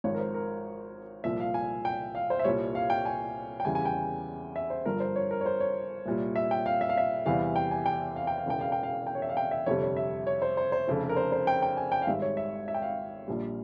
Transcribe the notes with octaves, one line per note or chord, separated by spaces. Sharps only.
G#1 G#2 F3 C#5
A#4
C5
A#4
C2 A#2 F3 E5
F5
G#5
G5
F5
C5
E5
C2 A#2 G3 C#5
F5
G5
G#5
G5
E2 C#3 E3 G3 G#5
G#5
G5
E5
C5
G1 G2 F3 A#4
C5
C#5
A#4
C#5
C5
C#5
C2 A#2 G3
E5
G5
F5
E5
F5
E5
E2 C3 E3 G3 F5
G5
G#5
G5
F5
G5
F5
E1 E2 C#3 E3 G5
F5
G5
F5
G5
C#5
E5
F5
G5
E5
G1 F2 C3 G3 C#5
C#5
E5
C#5
C5
C5
C5
F1 F2 C#3
A#4
C5
C5
G5
G5
G#5
G5
F5
G#1 G#2 G3 E5
C#5
E5
E5
G5
F5
A#1 A#2 G3